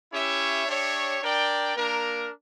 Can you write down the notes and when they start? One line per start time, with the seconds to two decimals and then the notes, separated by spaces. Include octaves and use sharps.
0.11 C#4 E4 G4 C#5 E5
0.66 D4 G4 C#5 E5
1.21 D4 A#4 D5 G5
1.76 A#3 D4 A#4